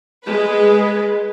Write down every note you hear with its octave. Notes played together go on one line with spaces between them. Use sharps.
G#3 B4